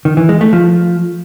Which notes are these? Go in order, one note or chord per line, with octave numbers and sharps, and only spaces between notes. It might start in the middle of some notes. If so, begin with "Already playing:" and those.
D#3
E3
G#3
A3
F3